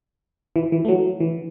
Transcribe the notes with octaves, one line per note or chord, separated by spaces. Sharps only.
E3
E3
A3
F#3
E3